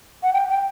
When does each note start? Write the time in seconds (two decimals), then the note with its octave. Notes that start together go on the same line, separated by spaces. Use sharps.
0.23 F#5
0.33 G5
0.49 G5